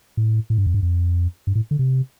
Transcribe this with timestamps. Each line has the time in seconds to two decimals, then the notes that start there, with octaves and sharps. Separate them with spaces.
0.17 A2
0.50 A2
0.58 G2
0.67 F2
0.74 G2
0.82 F2
1.47 G2
1.55 A2
1.71 D3
1.79 C3